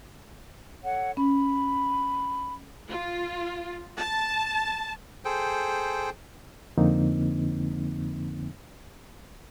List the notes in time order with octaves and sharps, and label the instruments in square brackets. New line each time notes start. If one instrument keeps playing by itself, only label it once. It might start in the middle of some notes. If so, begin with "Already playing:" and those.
[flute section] A4 C#5 F#5
[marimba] C#4 [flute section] B5
[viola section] F4
A5
[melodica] G#4 A4 C5 G5
[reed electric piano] F2 D3 F3 A#3 C4 D#4